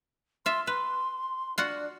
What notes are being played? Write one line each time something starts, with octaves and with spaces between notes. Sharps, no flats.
F4 E5 C6
B4 C6
D4 F4 F#4 F#5